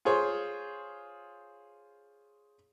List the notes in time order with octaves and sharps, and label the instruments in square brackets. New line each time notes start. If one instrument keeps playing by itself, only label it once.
[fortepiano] F4 G#4 C5 C#5